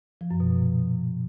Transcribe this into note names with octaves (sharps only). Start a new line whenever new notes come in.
F3
F#2
B2
A#2